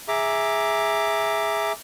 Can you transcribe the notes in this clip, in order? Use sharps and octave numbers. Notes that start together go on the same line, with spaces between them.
G#4 E5 A#5 D6